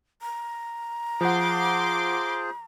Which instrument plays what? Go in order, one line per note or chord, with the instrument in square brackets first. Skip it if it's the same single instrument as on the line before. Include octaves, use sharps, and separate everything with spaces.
[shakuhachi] A#5
[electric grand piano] F3 F#5 [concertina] F4 G#4 C5 [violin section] C6 D6